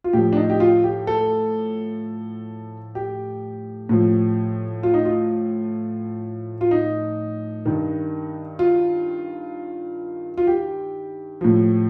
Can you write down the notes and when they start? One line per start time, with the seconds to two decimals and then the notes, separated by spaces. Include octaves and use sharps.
0.04 F4
0.13 A2 F3 G4
0.33 D4
0.37 D#4
0.50 G4
0.60 F4
0.84 G4
1.07 A4
2.95 G4
3.89 A2 F3
4.83 F4
4.94 D#4
5.05 F4
6.61 F4
6.71 D#4
7.65 G2 D#3
8.59 F4
10.37 F4
10.47 G4
11.41 A2 F3